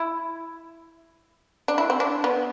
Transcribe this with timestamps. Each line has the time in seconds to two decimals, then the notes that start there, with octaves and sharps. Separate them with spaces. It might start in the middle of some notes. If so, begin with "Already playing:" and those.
Already playing: E4
1.68 D4
1.78 E4
1.90 C4
2.00 D4
2.24 B3